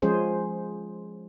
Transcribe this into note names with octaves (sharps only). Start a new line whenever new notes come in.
F3 G#3 C#4 G#4 C5